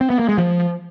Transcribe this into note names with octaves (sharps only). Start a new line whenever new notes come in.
C4
B3
A#3
G#3
F3